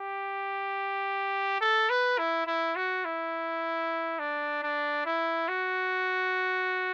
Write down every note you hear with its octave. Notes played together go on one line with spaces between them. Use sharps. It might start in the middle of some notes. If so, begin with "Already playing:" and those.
Already playing: G4
A4
B4
E4
E4
F#4
E4
D4
D4
E4
F#4